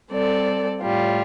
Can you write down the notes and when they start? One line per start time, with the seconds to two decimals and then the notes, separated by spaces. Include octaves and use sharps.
0.10 G3 C4 A4 D5
0.80 A2 G3 F4